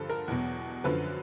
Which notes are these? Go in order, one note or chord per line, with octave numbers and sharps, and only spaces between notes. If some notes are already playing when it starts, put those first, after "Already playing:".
Already playing: G2 D3 F3 A4
A#4
E2 B2 F#3
F#2 D3 F3 B4